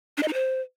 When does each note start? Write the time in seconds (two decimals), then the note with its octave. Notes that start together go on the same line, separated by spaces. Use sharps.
0.17 D4
0.23 D#5
0.28 D#4
0.33 C5